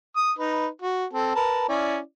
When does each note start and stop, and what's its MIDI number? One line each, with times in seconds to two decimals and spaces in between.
0.16 0.32 87
0.39 0.67 63
0.39 0.67 71
0.82 1.05 66
1.13 1.31 60
1.13 1.31 69
1.35 1.66 70
1.35 1.66 71
1.35 1.66 81
1.69 1.98 61
1.69 1.98 64
1.69 1.98 74